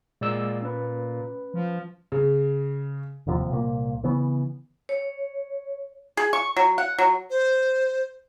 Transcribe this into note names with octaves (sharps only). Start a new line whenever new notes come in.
A#2 G#3 D5 E6
C#4 B4
F3
C#3
D1 D#2 C3 F3
C2 A#2 A#3
C#3 E3 B3
C#5
G#4
C#6
F#3
F#5
F#3
C5